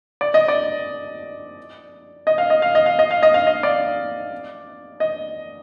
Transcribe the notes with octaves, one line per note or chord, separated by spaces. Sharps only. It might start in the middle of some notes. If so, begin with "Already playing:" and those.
D5
D#5
D5
D#5
F5
D#5
F5
D#5
F5
D#5
F5
D#5
F5
D#5
D5
D#5